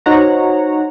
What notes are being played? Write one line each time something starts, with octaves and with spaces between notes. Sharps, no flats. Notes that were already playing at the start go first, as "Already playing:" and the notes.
D#4 F#4 C5 C#5 F#5 A#5